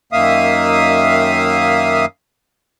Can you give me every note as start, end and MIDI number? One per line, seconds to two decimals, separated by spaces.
0.13 2.05 42
0.13 2.05 51
0.13 2.05 58
0.13 2.05 76
0.13 2.05 77
0.13 2.05 87